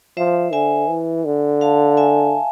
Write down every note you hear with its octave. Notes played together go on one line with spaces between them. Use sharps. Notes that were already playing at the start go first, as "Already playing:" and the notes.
F3 C5 E5
D3 E5 G#5
E3
D3
F5 A5
E5 G#5